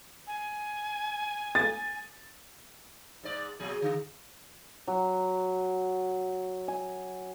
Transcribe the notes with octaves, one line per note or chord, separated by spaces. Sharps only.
G#5
A6
G#2 D5
A#2 F#3 G#4
D3
F#3
G#5